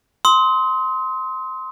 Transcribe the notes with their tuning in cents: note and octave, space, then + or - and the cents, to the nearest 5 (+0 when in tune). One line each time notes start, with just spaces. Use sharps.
C6 +0 D#6 +40